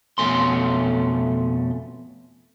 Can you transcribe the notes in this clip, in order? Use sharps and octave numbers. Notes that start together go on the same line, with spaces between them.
F2 B2 A3 C#4 C6